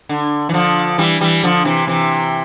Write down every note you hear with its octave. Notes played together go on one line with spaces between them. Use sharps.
D3
E3
D3 F3
E3 G3
E3 G3
D3 F3
C3 E3
C3 E3